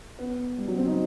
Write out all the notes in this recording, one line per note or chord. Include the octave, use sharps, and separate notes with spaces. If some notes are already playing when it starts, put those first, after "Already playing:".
B3
G3
F#3
C4
D#4